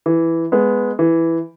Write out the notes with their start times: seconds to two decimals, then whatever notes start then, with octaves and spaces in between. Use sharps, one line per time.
0.06 E3
0.52 G#3 B3
0.99 E3